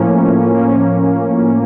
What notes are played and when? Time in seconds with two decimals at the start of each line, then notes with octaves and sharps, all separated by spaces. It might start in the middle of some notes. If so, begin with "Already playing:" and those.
Already playing: A2 F3 A#3 C#4
0.52 A2 F3 A#3 C#4